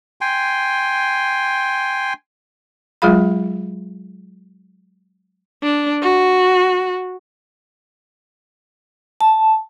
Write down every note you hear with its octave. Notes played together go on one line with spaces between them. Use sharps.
G5 G#5 C6
F#3 G#3 F4 G#4 F5 B5
D4
F#4
A5